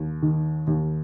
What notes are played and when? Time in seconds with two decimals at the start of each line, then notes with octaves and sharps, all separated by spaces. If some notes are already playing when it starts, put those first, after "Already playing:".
Already playing: D#2
0.22 D#3
0.67 D#2